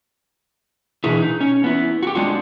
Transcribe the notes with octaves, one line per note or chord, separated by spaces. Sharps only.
B2 D3 E3 E4 G#4
D#4
C#4
B3 E4
F#4 G4
G#3 C4 D4 F4 F#4